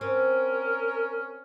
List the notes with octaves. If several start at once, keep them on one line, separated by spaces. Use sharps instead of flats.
C4 C#4 A#4